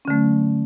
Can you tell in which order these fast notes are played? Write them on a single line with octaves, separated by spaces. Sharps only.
C#4 D3 A3 F#3